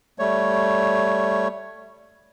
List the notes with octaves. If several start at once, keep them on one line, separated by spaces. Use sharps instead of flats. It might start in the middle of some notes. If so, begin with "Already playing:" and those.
G3 A3 C#5